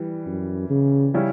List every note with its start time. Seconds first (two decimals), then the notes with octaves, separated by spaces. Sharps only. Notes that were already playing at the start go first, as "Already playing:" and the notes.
Already playing: E3 G3
0.26 F#2
0.70 C#3
1.14 C#3 G3 C#4 E4